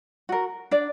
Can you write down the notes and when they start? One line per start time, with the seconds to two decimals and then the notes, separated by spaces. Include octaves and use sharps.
0.29 F#4 A#4
0.71 D4 D5